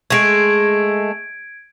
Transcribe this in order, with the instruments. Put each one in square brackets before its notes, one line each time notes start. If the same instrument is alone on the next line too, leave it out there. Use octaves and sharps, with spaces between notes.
[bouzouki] G#3 A3 [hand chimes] G#6 D7